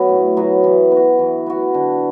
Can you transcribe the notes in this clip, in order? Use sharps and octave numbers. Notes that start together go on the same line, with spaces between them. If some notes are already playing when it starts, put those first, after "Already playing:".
Already playing: F#3 B3 F#4
A2
F#3 B3 F#4
E3
B3 F#4
E3
B3 F#4
D3